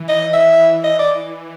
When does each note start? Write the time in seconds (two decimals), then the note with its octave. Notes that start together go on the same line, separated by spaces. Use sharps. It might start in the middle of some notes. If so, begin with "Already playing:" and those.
Already playing: E3
0.08 D#5
0.33 E5
0.83 E3 D#5
0.99 D5